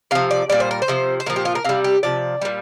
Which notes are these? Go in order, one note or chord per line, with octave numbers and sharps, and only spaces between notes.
C3 F3 F5
D5
A#2 G3 D5
C5
A#4
C5
C3 F3
C5
A#2 F3 A#4
G4
F4
A#4
C3 G3 F5
G4
C3 F3 D5
A#2 G3